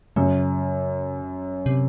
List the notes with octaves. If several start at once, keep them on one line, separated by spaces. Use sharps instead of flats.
F#2 C#3
C3